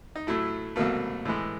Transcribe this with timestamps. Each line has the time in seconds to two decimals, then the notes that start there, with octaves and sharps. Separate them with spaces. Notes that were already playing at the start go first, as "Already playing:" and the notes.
0.16 D#4
0.27 A2 F#3 A3 E4
0.76 C2 B2 F#3 A3 A#3
1.25 A2 E3 G#3